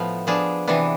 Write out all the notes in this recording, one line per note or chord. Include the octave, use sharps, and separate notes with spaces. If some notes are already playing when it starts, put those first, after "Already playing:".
Already playing: A2 F3 B3
F3 B3 D4 G#4
C3 E3 B3 D4